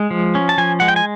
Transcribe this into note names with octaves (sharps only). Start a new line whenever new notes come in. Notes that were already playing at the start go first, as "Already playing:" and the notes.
Already playing: G#3
F3
C#4
A5
F3 G#5
G#3 F#5
G5
G#5